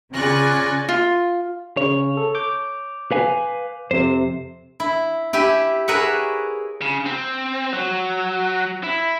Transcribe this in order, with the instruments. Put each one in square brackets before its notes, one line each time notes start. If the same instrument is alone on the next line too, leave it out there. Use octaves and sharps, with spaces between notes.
[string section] C#3 [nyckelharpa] F4 D5 [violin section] G#5 C#6 F#6 [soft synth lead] A#6
[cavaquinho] F4
[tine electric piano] C#3 [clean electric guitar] C#5
[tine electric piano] A4
D6 G6
[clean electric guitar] B4 F5 G#5
[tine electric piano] F2 C3 [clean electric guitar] C5
[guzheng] E4
E4 G4 E5 G#5
G#4 A#4 B4 C#5 E5 F#5
[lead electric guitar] C#3
C4
F#3
E4